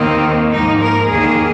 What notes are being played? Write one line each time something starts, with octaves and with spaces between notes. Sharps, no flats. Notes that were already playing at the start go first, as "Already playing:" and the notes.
Already playing: D#2 D#3 A#3 C4
G#2 F3 A#3 D#4
A#4
D#2 D#3 A#3 G#4